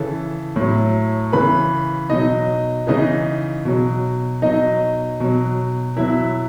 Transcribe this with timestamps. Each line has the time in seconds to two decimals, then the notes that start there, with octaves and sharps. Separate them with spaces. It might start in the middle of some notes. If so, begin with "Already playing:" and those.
Already playing: C#3 E3 A4 A5
0.56 A2 F#3
1.32 C#3 E3 B4 B5
2.10 B2 F#3 D#4 D#5
2.87 C#3 E3 D#4 D#5
3.65 B2 F#3
4.42 B2 F#3 D#4 D#5
5.20 B2 F#3
5.97 B2 F#3 E4 E5